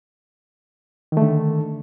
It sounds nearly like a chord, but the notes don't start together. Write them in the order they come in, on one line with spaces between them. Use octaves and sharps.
D#3 A3 D3